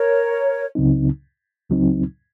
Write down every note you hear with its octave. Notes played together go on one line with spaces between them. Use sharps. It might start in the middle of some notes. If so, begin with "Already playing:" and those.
Already playing: A#4 C#5
C#2 C#3 F#3 C4 D#4
C#2 C#3 F#3 C4 D#4